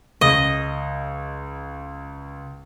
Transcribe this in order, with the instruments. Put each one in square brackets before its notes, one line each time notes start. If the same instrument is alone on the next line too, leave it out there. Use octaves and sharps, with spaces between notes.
[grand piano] C#2 [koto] D#5